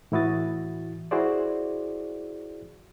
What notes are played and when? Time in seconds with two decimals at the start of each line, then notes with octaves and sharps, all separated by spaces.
0.12 A2 E3 E4 F#4 D#6 A6
1.11 E4 F#4 G#4 C5 D5